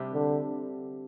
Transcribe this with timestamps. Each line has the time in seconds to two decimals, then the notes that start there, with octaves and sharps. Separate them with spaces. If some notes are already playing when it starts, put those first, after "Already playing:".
Already playing: C3 G3 D4 G4
0.13 D3